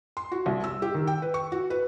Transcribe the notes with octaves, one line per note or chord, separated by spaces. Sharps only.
C6
F#4
C2
E6
G4
D#3
G5
B4
C#6
F#4
B4